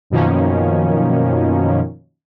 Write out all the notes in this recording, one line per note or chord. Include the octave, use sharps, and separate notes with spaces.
F#2 B2 D#3 F3 A#3 C#4